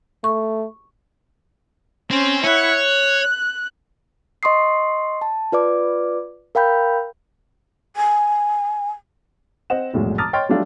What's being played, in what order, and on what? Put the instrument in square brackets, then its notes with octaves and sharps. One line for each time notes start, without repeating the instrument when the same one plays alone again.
[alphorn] A3 [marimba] C#6
[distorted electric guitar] C4 [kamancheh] C#4
[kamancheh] E4 F#5 [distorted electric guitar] C#5
[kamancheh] F#6
[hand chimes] D#5 C6 C#6 D#6 C7
A5
F4 B4 D5 D6
A#4 F5 G5 B5 G6
[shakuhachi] G#5
[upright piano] C4 D#5 F#5 E7
F1 B1 A2 G#3
A5 A#5 D6 D#6 F6 A6
C#5 D#5 G5 C6 F6 A6
F#3 G3 A3 D4 F4